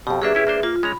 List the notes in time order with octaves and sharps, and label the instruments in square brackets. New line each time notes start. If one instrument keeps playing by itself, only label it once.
[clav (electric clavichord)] F2 B2 [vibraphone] G4
[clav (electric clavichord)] F#3 A#3 D4 [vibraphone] G#4 B4 E5
[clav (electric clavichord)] C#4 E4 G4
A#3 D4 C5
[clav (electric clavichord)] A#3 [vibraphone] F4
[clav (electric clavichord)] G#3 C#4 A#5 [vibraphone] B5